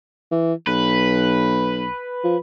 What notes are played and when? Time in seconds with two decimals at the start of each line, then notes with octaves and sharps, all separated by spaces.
0.31 E3
0.67 B1 B4
2.24 F3